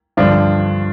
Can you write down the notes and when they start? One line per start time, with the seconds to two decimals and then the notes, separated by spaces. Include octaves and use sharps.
0.17 G2 D3 F3 D4